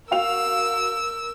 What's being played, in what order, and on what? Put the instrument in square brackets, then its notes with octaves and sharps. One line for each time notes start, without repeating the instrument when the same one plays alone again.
[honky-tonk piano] F#4 F5 F7 [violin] A#4 E6